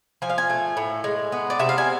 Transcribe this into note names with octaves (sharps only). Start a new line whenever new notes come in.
F3 G#5
F5
G#5
A3
A2
G#3
B3
D5
C3 E5
F5
G#5